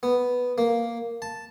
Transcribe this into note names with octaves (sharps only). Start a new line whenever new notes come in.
B3
A#3
A5